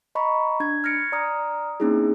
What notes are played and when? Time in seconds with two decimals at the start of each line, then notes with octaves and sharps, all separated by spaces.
0.15 D#5 A#5 B5 C#6
0.60 D4 G#6
0.84 F6 G#6 A#6 C#7 D7
1.12 D5 A#5 D#6 F6
1.80 A#3 C4 C#4 D#4 E4 G#4